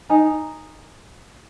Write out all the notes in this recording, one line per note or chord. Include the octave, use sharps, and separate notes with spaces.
D#4 G#5 A#5